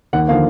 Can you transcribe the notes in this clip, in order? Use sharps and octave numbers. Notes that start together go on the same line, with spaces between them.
D#2 F#5
D3 F3 A#3 F5